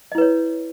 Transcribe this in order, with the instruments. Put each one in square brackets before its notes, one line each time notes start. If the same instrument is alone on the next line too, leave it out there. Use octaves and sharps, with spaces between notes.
[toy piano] D#5
E4
B4
C#5